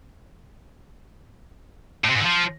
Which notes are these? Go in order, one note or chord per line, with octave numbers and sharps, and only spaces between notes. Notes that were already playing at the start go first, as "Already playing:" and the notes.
A2
C3
G#2
D3
F3